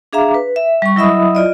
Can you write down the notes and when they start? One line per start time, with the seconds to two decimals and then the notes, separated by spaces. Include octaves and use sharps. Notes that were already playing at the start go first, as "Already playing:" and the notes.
0.13 D4 G#4 E5 F5 A#5 D6
0.34 B4
0.56 E5
0.82 G3 C#6
0.96 F#3 E4 D#5 E5 B5 D#6
1.35 F4 D5 D#5